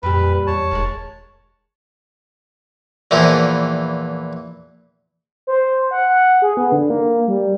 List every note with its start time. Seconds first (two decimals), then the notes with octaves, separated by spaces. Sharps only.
0.03 F2 A#2 G3 G4 B4
0.47 E2 C#5 A5
0.71 E1 D#3 F#3 G#3
3.11 E2 A#2 E3 F3
5.47 C5
5.91 F#5
6.09 F#5
6.42 G#4
6.57 B3
6.72 D3
6.90 A#3
7.28 G3